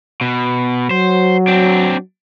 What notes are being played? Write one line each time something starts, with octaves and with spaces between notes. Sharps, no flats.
B2
F#3 C5
C4 D4